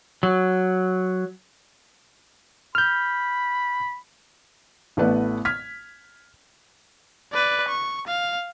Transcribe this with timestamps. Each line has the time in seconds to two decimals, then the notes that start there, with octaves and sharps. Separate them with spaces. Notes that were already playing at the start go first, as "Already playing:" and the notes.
0.23 F#3
2.75 B5 F6 G6
4.97 A1 A3 B3 B4 D5
5.45 F6 G#6 B6
7.33 B4 D5
7.69 C#6
8.08 F5